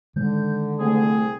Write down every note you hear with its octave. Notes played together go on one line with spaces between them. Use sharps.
D3 D#3 G#3 G6
C2 A3 C4 G#4